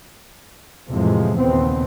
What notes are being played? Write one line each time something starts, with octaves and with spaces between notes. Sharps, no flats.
F2 A2 C3 E3 F3 G#3
D#2 A#2 C#3 B3 C4